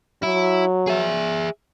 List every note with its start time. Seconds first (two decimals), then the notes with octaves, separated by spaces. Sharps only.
0.23 F#3 E4
0.87 G#4 E5